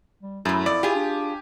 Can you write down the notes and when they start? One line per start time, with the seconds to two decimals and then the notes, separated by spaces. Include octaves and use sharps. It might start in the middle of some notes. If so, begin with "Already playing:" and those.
0.22 G3
0.45 F#2 A2 A3 E4
0.66 F2 D5
0.83 F4 G4 G#4 G#5
0.95 D4